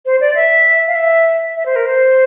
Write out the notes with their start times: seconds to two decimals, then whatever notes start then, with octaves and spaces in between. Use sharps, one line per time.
0.06 C5
0.21 D5
0.35 E5
0.88 F5
0.95 E5
1.56 E5
1.66 C5
1.76 A#4
1.86 C5